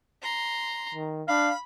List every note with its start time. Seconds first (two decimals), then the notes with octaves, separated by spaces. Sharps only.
0.22 A#5 C6
0.94 D#3
1.28 D4 F5 B5